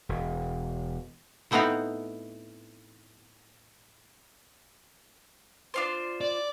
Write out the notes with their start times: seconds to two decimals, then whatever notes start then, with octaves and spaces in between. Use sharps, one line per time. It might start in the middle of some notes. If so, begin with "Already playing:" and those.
0.09 E1
1.51 A2 A3 B3 C4 D#4 F5
5.74 D4 F4 C5
6.21 D5